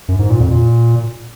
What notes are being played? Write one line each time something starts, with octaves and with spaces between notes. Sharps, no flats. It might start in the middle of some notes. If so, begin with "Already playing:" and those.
F#2
G#2
A#2
F2
A#2